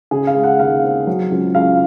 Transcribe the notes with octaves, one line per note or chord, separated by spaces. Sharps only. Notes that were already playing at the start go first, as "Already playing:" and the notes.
C#3 G#4
F5
G#3
F#5
D#2 F5
C4
F#3
C#2
C#2 F5